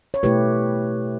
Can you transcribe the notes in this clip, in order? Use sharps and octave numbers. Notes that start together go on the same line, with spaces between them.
C#5
B2 A3 E4 G4 B4